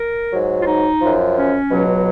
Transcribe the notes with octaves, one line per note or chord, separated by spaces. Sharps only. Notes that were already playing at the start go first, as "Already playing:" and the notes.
Already playing: A#4
G#2 F#3
F4
D#4
F#2 F3
C#4
C#2 B2 F#3